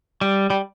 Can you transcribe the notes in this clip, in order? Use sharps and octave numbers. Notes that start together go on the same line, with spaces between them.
G3
G3